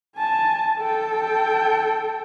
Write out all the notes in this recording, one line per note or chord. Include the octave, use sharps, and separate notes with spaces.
G#5 A5
A4 G5